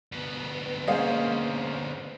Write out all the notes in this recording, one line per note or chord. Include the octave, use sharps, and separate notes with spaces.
D2 B3
G#3 A#3 C#4 C5 F5 F#5